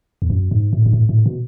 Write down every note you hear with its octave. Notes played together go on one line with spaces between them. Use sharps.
E2
F#2
G#2
A2
G#2
A2
A2
B2